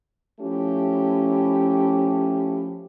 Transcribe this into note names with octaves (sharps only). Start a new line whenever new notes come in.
F3 A3 C#4 E4 G4